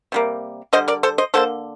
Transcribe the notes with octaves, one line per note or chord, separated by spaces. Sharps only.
C3 G3 A#3
D3 G3 C5 D#5
A#4 D5
A4 C5
C5 D#5
D3 F#3 A#3 A4 C5